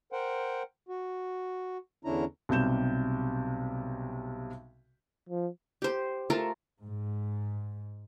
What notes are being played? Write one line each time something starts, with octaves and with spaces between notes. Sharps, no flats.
A#4 C5 F#5 G5
F#4
E2 D3 C#4 D4 E4 A#5
B1 C3 G3 G6 E7
F3
G4 C5
A3 F4 A4 A#4
G#2